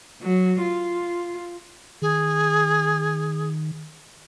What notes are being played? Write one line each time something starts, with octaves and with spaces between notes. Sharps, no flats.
F#3
F4
D#3 G#4